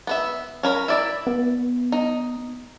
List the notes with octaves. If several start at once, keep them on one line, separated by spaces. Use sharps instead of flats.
B3 B4 E5
C#4 A#4 B5
E4 D5 E5
B3
D#4